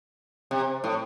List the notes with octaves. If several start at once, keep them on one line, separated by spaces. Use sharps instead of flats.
C3
A2